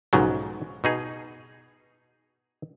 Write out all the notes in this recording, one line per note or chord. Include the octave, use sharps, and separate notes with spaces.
B1 G#2 C#3 F3 F#3
B2 D#4 G#4